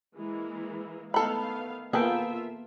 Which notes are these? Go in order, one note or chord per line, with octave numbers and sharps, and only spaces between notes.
E3 G#3 A#3
D#3 A3 B3 A4 F5 B5
A#3 B3 F4 G#4 A4 E5 G5